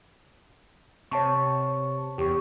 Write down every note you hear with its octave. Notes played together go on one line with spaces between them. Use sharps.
C3 C#5 A5 C#6
E2 G4 C#6